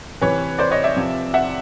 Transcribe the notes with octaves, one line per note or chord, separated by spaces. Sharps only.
C3 E3 B4 C#5
C5 D5
C#5 D#5
D5 E5
C3 F3
E5 F#5